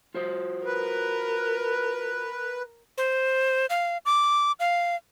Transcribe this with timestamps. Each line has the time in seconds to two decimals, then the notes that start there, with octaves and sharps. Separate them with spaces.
0.15 F4 F#4 C5
0.66 A#4 B4
2.98 C5
3.70 F5
4.06 D6
4.60 F5